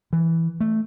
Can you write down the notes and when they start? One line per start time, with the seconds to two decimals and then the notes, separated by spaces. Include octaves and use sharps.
0.13 E3
0.61 A3